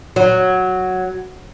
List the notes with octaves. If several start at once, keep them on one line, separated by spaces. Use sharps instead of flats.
F#3